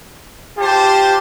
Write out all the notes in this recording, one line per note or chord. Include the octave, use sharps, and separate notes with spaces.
F4 G4 C5 A5